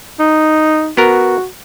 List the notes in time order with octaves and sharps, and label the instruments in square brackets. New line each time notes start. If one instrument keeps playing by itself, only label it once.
[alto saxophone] D#4
[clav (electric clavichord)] B3 A#4 [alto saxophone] F#4